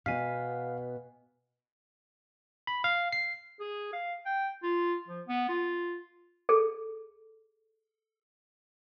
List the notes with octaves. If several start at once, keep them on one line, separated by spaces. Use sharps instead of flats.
B2 B3 F5 G#5 B6
B5
F5
C7
G#4
F5
G5
F4
F3
B3
F4
G#4 A4